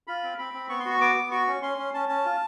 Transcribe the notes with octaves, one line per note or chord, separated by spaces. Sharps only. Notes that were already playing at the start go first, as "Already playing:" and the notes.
F4 B5
C4
C4 B5
C4
B3 C#6
C6
F#4 C#6
B3 D6
B3
F#4 C#6
C#4
C#4 C6
C#4
C#4 A5
C#4 A5
F4